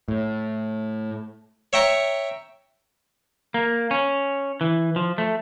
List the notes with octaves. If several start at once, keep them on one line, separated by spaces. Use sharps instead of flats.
A2
C#5 E5 G5 A#5 C#6
A#3
C#4
E3
F3
A3